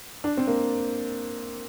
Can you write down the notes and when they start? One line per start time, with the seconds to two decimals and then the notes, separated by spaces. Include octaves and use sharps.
0.24 D4
0.37 C4
0.47 A#3